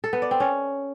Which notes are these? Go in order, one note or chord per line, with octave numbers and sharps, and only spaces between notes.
A4
B3
D5
C4
C#4